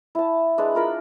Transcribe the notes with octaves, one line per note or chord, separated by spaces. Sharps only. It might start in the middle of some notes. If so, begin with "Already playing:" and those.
E4 A5
G#3 D4 G#4 B4
F4 A#4 B5